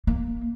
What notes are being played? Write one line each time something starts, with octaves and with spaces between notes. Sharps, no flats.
A#3